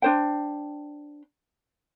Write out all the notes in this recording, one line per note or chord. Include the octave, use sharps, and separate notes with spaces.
D4 C5 G5